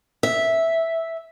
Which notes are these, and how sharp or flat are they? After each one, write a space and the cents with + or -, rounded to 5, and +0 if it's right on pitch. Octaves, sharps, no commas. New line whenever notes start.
E5 -5